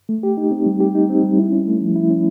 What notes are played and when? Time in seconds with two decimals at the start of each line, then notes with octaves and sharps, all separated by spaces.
0.09 A3
0.23 G4
0.37 D#4
0.51 C4
0.66 G3
0.80 G4
0.95 D#4
1.09 C4
1.23 G3
1.38 E4
1.52 C#4
1.67 A3
1.81 F3
1.96 E4
2.10 C#4